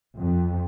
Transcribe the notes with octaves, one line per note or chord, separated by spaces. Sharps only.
F2